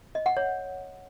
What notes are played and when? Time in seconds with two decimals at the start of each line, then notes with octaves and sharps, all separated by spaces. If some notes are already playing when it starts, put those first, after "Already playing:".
0.15 D#5
0.26 F#5
0.37 C#5